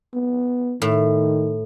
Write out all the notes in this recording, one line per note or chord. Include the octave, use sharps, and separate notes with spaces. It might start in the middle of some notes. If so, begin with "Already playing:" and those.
B3
A2 D#3